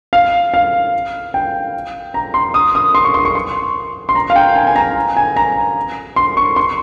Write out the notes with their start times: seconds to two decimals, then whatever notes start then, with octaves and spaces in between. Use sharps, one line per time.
0.13 F5
0.54 F5
1.34 G5
2.14 A#5
2.34 C6
2.54 D#6
2.75 D#6
2.95 C6
3.04 C#6
3.14 C6
3.25 C#6
3.35 C6
4.09 C6
4.15 A#5
4.30 F5
4.36 G5
4.56 G#5
4.67 G#5
4.76 A#5
5.17 G#5
5.36 A#5
6.16 C6
6.37 C#6
6.56 C6